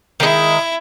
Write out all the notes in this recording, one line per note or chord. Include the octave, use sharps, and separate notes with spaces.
D#3 G#3 E4